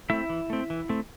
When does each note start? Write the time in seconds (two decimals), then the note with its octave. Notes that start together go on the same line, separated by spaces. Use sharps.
0.10 A3 C4 E4 E5
0.30 E3
0.50 A3 C4
0.70 E3
0.89 A3 C4